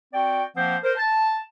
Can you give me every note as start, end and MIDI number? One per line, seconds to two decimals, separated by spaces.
0.14 0.42 60
0.14 0.42 66
0.14 0.42 74
0.14 0.42 79
0.56 0.77 53
0.56 0.77 58
0.56 0.77 60
0.56 0.77 72
0.56 0.77 78
0.83 0.93 70
0.83 0.93 72
0.97 1.38 81